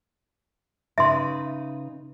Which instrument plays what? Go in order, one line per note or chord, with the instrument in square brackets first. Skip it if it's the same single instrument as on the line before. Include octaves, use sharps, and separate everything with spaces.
[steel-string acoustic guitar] C#3 D#4 B4 [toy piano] E5 C6